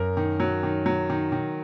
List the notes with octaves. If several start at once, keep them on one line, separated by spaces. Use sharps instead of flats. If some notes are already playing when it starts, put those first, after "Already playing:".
Already playing: F#2 A#4
D#3
F#3
D#3
F#3
D#3
D#3